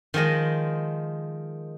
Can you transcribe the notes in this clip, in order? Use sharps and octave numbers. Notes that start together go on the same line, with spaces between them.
D#3 F3 G#3 D#5